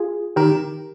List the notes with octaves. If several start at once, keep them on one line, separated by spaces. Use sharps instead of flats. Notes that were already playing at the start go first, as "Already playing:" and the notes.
Already playing: F4 G#4
D#3 D#4 G4 A#4